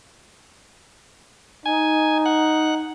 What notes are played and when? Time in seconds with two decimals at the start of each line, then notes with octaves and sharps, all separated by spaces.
1.66 D#4 G#5
2.26 F#5